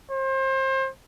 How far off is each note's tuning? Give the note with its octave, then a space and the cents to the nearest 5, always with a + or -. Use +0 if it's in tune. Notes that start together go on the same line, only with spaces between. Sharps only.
C5 +30